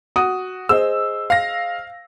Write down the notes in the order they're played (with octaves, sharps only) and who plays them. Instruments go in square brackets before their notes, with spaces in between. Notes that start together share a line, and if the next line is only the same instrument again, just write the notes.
[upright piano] F#4 [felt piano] D#6
[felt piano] G#4 C5 D#5 [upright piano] E6
[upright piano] F5 A#6